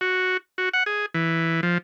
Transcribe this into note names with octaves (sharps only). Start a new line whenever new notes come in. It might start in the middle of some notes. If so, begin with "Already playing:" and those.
F#4
F#4
F#5
G#4
E3
F3